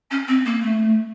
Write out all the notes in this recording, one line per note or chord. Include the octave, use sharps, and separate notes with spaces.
C#4
C4
A#3
A3